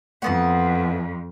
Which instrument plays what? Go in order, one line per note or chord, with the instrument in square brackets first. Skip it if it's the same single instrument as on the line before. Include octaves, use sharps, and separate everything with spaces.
[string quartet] F2 [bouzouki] E3 B3 F#5